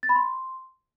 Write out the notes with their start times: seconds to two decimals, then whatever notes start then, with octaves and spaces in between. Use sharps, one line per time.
0.03 A6
0.09 B5
0.16 C6